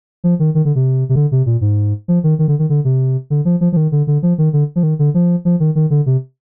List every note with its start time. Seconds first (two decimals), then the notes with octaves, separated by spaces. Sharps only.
0.24 F3
0.39 D#3
0.55 D#3
0.65 D3
0.75 C3
1.09 C3
1.16 D3
1.32 C3
1.46 A#2
1.61 G#2
2.08 F3
2.24 D#3
2.39 D#3
2.48 D3
2.59 D#3
2.70 D3
2.85 C3
3.30 D3
3.45 F3
3.61 F3
3.72 F3
3.77 D#3
3.92 D3
4.07 D3
4.23 F3
4.38 D#3
4.53 D3
4.76 F3
4.83 D#3
4.99 D3
5.14 F3
5.45 F3
5.60 D#3
5.75 D#3
5.90 D3
6.06 C3